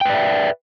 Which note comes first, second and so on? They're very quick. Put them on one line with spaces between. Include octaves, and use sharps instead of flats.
G5 B4 D5 E5